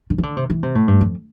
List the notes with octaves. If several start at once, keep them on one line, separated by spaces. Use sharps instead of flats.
D3
E3
D3
C3
E3
C3
A2
G2
F2